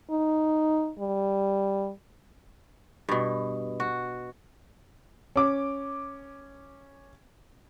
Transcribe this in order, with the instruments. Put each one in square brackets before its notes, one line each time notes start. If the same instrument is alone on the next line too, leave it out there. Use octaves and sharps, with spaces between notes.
[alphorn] D#4
G3
[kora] G2 B2
F#4
[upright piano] C#4 D6